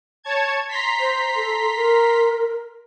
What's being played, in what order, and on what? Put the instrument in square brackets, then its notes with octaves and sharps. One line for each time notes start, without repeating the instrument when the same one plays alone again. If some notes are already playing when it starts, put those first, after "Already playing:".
[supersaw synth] C#5 A5 G#6
A#5 C6 B6
[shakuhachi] C5
A4
A#4